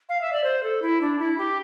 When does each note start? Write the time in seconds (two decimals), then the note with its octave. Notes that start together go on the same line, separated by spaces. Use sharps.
0.09 F5
0.21 E5
0.32 D5
0.43 C5
0.63 A4
0.82 E4
1.01 D4
1.19 E4
1.38 G4